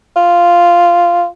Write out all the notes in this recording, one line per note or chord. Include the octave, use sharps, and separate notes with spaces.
F4